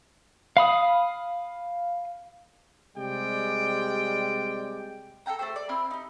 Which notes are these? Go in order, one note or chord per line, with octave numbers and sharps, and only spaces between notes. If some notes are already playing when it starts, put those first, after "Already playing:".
F5 B5 D#6
C3 G3 G#3 G4 D5 G5
A4 F5 G5 A#5
A3 D4 G4 C5
D5
C4 E4 B5 F6
D#4 G4